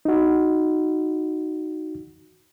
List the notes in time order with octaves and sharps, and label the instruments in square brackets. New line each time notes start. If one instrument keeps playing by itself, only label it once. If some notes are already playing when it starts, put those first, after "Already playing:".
[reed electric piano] D#4 F#4